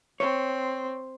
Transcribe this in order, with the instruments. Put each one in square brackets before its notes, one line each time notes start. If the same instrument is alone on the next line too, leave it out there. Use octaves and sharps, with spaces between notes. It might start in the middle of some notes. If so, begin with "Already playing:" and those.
[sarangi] C4 [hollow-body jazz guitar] C#5